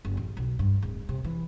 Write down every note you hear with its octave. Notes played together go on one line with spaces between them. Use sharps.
F#1
A1
B1
G2
D1
C3
E3